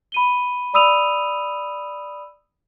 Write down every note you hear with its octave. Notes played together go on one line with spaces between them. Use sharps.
B5 D#7 G7
D5 B5 D#6 E6 D#7 F7